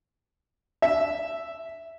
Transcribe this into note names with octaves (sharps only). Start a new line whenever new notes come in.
E5